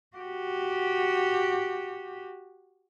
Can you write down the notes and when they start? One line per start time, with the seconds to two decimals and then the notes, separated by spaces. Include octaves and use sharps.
0.17 F#4 G4